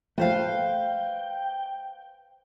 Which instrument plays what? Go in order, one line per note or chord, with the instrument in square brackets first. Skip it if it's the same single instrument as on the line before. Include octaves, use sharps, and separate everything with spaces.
[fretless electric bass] A3 [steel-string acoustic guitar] B4 C5 F5 [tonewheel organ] G5